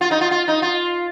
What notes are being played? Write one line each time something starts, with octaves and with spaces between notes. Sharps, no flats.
F4
D#4
F4
F4
D#4
F4